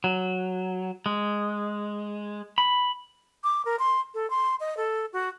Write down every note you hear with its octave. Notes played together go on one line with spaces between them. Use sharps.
F#3
G#3
B5
D6
A#4
C6
A4
C6
D#5
A4
F#4